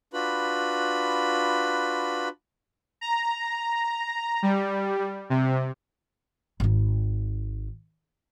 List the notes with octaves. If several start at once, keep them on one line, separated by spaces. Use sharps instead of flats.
D4 F4 F#4 B4 B5
A#5
G3
C3
G#1 D#4